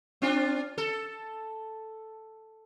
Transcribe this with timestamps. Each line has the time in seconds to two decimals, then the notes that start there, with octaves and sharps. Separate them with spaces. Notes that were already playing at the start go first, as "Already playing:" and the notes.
0.22 C4 D4 F4
0.78 A4